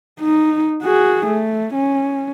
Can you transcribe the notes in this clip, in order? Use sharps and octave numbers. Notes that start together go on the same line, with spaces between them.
D#4
F#4 G#4
A3
C#4